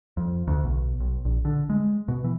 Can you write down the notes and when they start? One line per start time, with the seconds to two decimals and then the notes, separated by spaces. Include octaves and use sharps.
0.17 F2
0.48 D2
0.64 B1
1.00 B1
1.25 A#1
1.45 D3
1.70 G#3
2.08 B2
2.24 E3